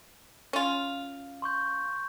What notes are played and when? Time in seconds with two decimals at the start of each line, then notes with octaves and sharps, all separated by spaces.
0.53 C#4 F4
1.42 C6 C#6 G6